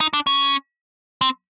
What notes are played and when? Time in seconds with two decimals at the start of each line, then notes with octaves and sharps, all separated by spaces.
0.01 D#4
0.13 D4
0.27 C#4
1.21 C4